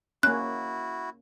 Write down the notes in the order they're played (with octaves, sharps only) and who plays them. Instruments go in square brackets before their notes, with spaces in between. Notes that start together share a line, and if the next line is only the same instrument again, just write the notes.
[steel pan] A#3 C#4 [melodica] E4 F#4 [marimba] F#6